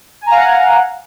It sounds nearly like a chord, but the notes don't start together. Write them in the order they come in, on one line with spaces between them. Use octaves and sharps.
G#5 A#5 F5 F#5